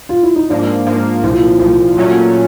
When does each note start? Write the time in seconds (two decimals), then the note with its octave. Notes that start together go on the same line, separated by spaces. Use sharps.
0.09 F4
0.23 E4
0.36 D#4
0.50 G#2 F3 A#3 D4
0.87 G#2 F3 A#3
1.23 C2 A#2 F3 E4
1.31 F4
1.39 E4
1.60 C2 A#2 F3
1.97 A#2 F#3 A3 C#4 F4